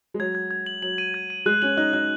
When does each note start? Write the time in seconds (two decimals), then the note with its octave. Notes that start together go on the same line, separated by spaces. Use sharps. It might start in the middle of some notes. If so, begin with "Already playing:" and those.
0.14 G#3
0.19 F#3 G#6
0.35 G#6
0.51 G#6
0.66 F#7
0.82 F#3 F#7
0.98 D#7
1.14 G#6
1.30 D#7
1.46 G#3 F#6
1.62 C#4 F#7
1.77 D#4 F#6
1.93 D#4 F#6